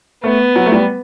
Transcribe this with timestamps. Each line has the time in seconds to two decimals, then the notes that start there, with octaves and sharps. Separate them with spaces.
0.23 A3 B3
0.56 F#3
0.66 A3
0.72 G3